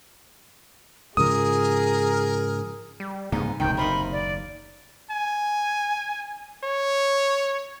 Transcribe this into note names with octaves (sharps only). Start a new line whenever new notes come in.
G#2 C#3 F3 G#4 A#4 D#6
G3
C2 G#2 C#3 A#3 B3 D#4
D#1 C#2 C3 D#3 G5
F#1 D#2 D#4 F4 A#4 B5
D5
G#5
C#5